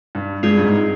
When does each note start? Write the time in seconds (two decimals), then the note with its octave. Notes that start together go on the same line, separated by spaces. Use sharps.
0.15 G2
0.43 G2 G#3 C4 F4 G#4
0.58 G2
0.64 G#2